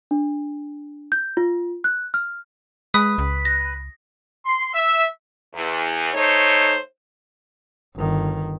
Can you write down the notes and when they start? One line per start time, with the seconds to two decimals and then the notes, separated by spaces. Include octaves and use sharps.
0.11 D4
1.12 G6
1.37 F4
1.84 F#6
2.14 F6
2.94 G#3 B4 D#6
3.18 C#2
3.45 A#6
4.45 C6
4.74 E5
5.54 E2
6.14 A3 D#4 C5 C#5
7.96 G1 D#3